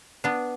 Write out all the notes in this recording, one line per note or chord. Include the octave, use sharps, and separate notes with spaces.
B3 D4